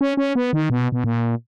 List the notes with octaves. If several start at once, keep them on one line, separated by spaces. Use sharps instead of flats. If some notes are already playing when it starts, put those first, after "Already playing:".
C#4
C#4
B3
D#3
B2
B2
A#2